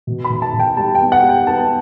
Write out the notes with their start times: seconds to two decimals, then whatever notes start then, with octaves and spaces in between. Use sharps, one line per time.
0.07 B2
0.24 B5
0.30 B2
0.42 A5
0.54 B2
0.59 G5
0.77 G3 A5
0.95 G5
1.00 B3
1.12 F#5
1.23 G3
1.29 G5
1.47 B3 A5